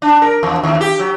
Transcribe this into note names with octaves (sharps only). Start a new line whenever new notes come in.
D4
A#4
E2
D#2
G4
F#3